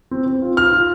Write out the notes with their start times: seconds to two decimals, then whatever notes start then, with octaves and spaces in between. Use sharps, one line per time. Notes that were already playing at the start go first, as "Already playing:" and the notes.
0.11 C4
0.27 C4
0.42 F4
0.57 F4 F6
0.73 F4